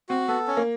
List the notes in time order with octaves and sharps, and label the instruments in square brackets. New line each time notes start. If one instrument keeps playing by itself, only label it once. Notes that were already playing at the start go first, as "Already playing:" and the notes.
[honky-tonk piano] C4 [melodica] F#4
[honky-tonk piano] B3 [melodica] A4
[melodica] C#4
[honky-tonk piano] A#3